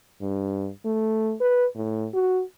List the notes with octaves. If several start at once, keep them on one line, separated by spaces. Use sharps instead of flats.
G2
A3
B4
A2
F#4